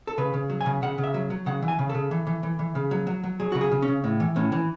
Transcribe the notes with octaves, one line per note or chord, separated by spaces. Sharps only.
A4
C#3 B4
C#3
F#3
G#5
C#3
C#3 F#5
C#3
E5
F#3
F#3
C#3 F#5
E3
G#5
C#3
C#3 A4
E3
E3
E3
E3
C#3
F#3
F#3
F#3
F#3 G#4
C#3 F#4
G#4
C#3
C#4
C#3
A2
E3
A2 C#4
E3